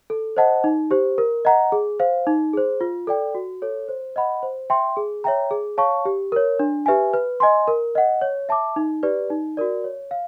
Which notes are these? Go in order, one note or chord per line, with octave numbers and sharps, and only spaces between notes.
A4
C5 D#5 F#5 A5
D#4
G4 C5
A#4
D#5 F#5 A#5
G#4
C5 F5
D#4
G#4 C5
F4
A4 D5 G5
F#4
A4 C#5
C5
D#5 F#5 B5
C5
E5 G5 C6
G#4
C#5 E5 G5 A#5
G#4
C#5 F5 A5 C#6
G4
A#4 C#5
D4
G4 B4 E5 G#5
B4
D#5 G#5 C6
A#4
D#5 F#5
C#5
E5 A5 D6
D#4
G4 B4 D5
D#4
F#4 A#4 D5
C#5
F5